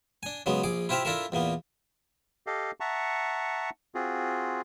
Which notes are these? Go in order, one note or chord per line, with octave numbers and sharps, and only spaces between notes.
D4 G#5
C#3 F#3 G#3 B3
A#1 G#4 D6
E4 F4 G4 C5 E5 F5
D4 E4 F4 A4 A#4 E5
E2 A#2 A#3 B3
G4 A4 D#5 F5
E5 F#5 A5 A#5 C#6
C4 F4 F#4 G#4